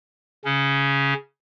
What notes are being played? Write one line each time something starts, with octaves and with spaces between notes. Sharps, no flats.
C#3 C#4